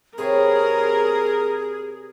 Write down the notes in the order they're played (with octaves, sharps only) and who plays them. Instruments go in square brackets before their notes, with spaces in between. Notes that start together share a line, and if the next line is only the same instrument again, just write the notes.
[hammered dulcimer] C3 B4 C#5 [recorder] G#4 [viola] A#4